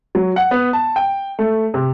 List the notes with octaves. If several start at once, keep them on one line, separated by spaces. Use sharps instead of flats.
F#3
F#5
B3
A5
G5
A3
C3